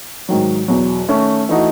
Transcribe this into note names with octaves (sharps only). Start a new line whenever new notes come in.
G#2 D#3 F#3
E2 B2 F#3
D#3 A3 C#4
E3 A3 D#4 F#4